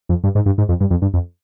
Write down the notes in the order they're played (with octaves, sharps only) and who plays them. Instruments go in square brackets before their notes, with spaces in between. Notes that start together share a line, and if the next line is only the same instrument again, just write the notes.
[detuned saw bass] F2
G2
G#2
G2
G#2
F2
G2
F2
G2
F2